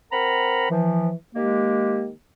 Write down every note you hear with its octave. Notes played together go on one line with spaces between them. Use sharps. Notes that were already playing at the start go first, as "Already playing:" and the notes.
C4 A#4 F#5 A#5 B5
E3 F3
D#3 G#3 A#3 G4